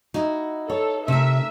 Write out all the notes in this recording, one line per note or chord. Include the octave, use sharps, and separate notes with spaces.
D#4 E4 F#4
A4 C#5
C3 A3 A#4 E5